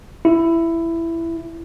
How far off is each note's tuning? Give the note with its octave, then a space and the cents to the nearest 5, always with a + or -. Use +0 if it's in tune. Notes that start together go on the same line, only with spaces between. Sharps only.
E4 +10